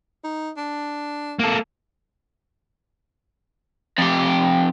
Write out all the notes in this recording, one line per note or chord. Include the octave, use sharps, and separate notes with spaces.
D#4
D4
A#3 A4
F2 G4